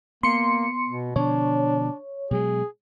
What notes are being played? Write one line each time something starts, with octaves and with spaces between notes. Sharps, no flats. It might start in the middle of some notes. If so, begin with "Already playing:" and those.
A#3 B3 C6 C#7
B2
B2 D3 F3 D4 C#5
B2 F#3 G#3 G#4